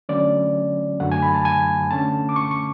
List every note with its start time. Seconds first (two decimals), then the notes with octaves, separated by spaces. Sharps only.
0.09 D3 F#3 A3 C#4 D5
1.00 F#2 D3 F#3 A3 F#5
1.12 G#5
1.22 B5
1.34 A5
1.45 G#5
1.90 D3 A3 C#4 A5
2.29 D6
2.36 C#6
2.51 C#6